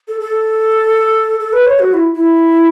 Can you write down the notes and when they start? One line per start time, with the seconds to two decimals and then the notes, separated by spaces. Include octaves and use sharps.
0.08 A4
0.20 A4
1.40 A4
1.53 B4
1.66 C#5
1.79 F#4
1.93 E4
2.15 E4